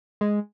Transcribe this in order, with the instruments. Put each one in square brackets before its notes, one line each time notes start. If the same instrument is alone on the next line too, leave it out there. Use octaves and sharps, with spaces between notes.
[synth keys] G#3